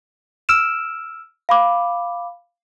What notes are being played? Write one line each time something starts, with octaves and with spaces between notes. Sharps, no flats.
E6 F6 D7 E7
F5 B5 D6